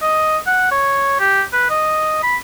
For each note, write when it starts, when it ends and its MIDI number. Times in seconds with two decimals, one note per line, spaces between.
0.02 0.38 75
0.47 0.70 78
0.71 1.17 73
1.20 1.42 67
1.53 1.67 71
1.70 2.23 75
2.23 2.37 83